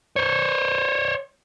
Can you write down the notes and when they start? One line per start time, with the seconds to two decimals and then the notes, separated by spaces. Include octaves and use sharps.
0.16 C5 C#5